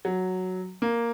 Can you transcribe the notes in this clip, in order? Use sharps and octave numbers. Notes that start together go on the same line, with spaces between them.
F#3
A#3